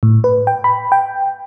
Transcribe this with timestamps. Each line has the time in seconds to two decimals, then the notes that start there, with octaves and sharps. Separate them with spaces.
0.03 A2
0.24 B4
0.47 G5
0.64 B5
0.92 G5